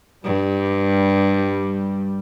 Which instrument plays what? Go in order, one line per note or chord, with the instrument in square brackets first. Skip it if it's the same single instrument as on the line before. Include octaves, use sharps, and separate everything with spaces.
[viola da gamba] G2 [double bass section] G3